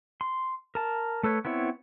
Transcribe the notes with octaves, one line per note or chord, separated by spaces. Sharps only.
C6
A#4 A5
A3 A4 B4 C#5
B3 C4 E4 C#5